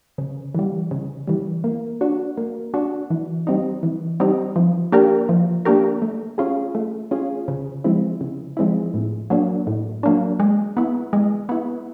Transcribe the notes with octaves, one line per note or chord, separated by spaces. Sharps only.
C#3
E3 G3
C#3
E3 G3
A#3
D4 F#4
A#3
D4 F#4
E3
G3 C4 D#4
E3
G3 C4 D#4
F3
A#3 D4 G4 A#4
F3
A#3 D4 G4 A#4
A3
C#4 F4 G#4
A3
C#4 F4 G#4
C#3
F3 G#3 C4 E4
C#3
F3 G#3 C4 E4
A2
F#3 A#3 D4
A2
F#3 A#3 D4
G#3
B3 E4
G#3
B3 E4